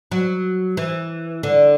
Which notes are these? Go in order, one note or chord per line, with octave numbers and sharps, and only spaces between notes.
F#3
E3
D3